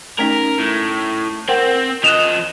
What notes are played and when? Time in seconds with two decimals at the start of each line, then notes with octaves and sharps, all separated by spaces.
0.19 A3 C#4 D#4 A#4
0.59 A2
1.48 C4 A#4 F#5 G5
2.04 F3 D#5 F#6 E7 F7